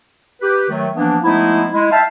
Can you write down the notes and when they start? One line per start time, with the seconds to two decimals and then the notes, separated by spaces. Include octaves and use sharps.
0.42 G4 B4
0.70 D#3 F#3 A3
0.96 E3 F3 A#3 B3 D4
1.24 F3 G#3 A3 B3 D#4 E4
1.73 G#3 E4
1.92 E5 F5 G5 A5